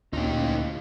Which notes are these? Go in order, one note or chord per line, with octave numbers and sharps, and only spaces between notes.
D2 A#2 C#4 D#4 F4 G4
E4 C5 F5